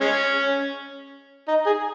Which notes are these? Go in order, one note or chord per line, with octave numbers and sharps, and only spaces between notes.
G#3 C#4
D#4
G#4